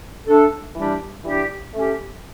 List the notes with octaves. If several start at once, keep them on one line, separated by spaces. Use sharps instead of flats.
A3 D4 A4
E3 G3 D4 G4
E3 G3 D4 G4
A3 C#4 G4